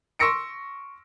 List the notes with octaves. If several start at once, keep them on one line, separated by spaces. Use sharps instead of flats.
C6 C#6 E6 A#6 C#7 D7